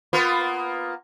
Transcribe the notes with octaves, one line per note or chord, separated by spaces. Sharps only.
A#3 B3 F4